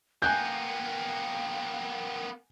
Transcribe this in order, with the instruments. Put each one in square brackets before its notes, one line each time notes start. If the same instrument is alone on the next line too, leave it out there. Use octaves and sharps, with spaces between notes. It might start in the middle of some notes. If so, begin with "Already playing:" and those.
[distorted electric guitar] A#3 B3 [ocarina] G5 [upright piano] G#5 F#6 G6